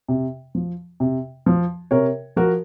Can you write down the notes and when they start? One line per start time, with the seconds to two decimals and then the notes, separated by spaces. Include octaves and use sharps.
0.08 C3
0.55 F3
1.00 C3
1.46 F3
1.91 C3 A#4 C#5
2.36 F3 F#4 A#4